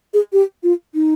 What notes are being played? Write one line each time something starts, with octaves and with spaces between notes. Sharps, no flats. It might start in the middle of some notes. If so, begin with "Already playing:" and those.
G#4
G4
F4
D#4